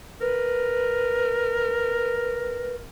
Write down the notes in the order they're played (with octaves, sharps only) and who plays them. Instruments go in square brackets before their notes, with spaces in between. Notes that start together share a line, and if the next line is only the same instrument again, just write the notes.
[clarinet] A#4 [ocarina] B4